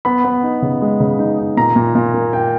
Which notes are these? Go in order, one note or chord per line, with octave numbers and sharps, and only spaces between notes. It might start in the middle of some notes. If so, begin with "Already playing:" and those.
B3 B5
B3
D#4
C#3
G#3
C#3
D#4
D#4
A#2 A#5
A#2
A#2
A#3
A#3 G5